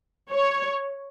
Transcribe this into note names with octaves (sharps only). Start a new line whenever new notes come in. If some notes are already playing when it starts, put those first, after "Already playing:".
C#5